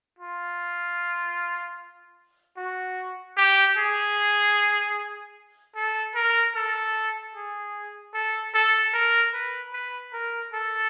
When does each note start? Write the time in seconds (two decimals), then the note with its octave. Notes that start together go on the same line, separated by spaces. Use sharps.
0.19 F4
2.57 F#4
3.37 G4
3.77 G#4
5.75 A4
6.15 A#4
6.55 A4
7.35 G#4
8.14 A4
8.54 A4
8.93 A#4
9.33 B4
9.73 B4
10.13 A#4
10.53 A4